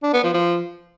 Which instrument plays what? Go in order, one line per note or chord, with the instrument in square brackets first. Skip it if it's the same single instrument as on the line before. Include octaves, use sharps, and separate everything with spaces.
[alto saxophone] D4
B3
F3
F3